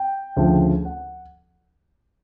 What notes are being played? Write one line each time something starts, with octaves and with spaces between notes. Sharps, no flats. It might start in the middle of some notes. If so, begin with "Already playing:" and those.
Already playing: G5
D2 C#3 F3
F#5